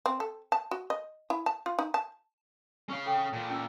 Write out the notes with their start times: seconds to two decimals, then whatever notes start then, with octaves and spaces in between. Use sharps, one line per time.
0.06 C4
0.20 A4
0.52 A5
0.71 F#4
0.90 D#5
1.30 E4
1.46 A5
1.66 F4
1.79 D#4
1.94 A5
2.89 C#4 F5
3.06 A4 G5
3.33 A#2 F3
3.50 C#4 E6